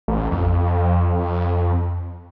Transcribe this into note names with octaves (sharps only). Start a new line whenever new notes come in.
A1
F2